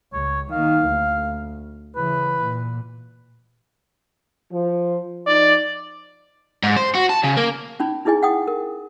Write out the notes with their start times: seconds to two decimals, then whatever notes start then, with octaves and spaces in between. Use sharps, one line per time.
0.13 C#2 C#5
0.52 D#3 A#3 F5
0.87 D2
1.96 C#3 E3 B4
2.42 A#2
4.51 F3
5.27 F3 D#4 D5
6.63 G#2
6.77 C5
6.95 F#4
7.09 A5
7.23 C#3
7.37 A#3
7.80 C#4 D#4 B5
8.05 D#4 E4 G#4 D#5 G#5
8.23 F#5 G5 D#6
8.48 A#4